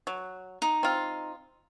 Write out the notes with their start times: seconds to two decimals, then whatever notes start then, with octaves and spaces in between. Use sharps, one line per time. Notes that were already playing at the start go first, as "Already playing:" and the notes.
0.07 F#3
0.62 D#4
0.83 C4 F4